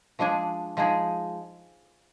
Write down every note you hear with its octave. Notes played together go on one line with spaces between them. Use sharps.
F3 G#3 D4 G#4
F3 G#3 D#4 G#4